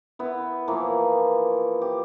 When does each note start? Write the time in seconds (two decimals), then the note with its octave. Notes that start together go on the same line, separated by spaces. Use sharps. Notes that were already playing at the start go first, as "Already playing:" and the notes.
0.19 B3 E4
0.68 E3 F3 A#3
1.82 G4